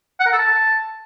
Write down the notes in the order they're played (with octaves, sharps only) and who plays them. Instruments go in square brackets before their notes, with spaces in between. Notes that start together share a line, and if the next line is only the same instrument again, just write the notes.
[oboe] F#5
A#4
A4
A5